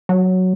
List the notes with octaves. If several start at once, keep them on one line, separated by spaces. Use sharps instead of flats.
F#3